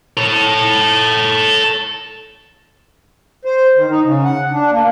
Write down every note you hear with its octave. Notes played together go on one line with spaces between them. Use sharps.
A4 C#5
C5
D#3
D#4
C#3
F#5
D4
A#3